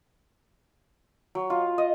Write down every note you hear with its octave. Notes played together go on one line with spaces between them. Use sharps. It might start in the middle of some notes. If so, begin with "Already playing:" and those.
F#3
F4
D#5